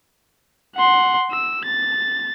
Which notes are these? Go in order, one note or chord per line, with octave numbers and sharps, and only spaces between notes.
F#5 C6
E6
A6